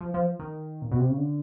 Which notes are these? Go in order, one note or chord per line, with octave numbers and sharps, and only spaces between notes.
F3
F3
D#3
A#2
B2
C3
C#3
D3